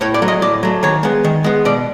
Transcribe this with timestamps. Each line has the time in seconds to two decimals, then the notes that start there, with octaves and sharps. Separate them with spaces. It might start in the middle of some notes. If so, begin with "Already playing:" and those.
0.01 A2 C#5
0.14 D5
0.22 F#3 A3
0.28 D#5
0.42 A2 D5
0.63 F#3 A3
0.83 D#3 C#5
1.03 G#3 B3
1.24 D#3
1.44 G#3 B3
1.65 B2 D5